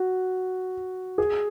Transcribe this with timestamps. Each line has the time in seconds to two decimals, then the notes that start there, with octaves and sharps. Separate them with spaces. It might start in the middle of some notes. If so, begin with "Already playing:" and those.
Already playing: F#4
1.18 G#4